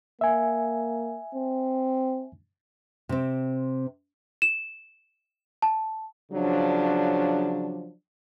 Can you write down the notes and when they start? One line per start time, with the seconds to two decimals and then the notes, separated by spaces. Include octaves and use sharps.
0.21 A#3 E5 G#5
1.35 C4
3.09 C3 C4
4.42 E7
5.62 A5
6.32 C#3 F3 F#3 D4